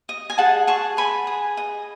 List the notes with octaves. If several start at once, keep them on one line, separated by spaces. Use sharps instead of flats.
D#5
G#5
G#4 F#5 A5
G#4 A5 C#6
B4 G#5 B5
G#4
D#5